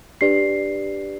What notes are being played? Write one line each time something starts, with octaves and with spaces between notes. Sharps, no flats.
D4 G4 B4 D5 C7